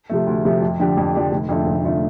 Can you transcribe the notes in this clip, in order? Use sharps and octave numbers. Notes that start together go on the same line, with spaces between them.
C3 F3 A3
D2
C3 F3 A3
F2
D3 F3 D4 G4
F2
D3 F3 D4 G4
F1
F2 D3 A3 F4
F1
F2 D3 A3 F4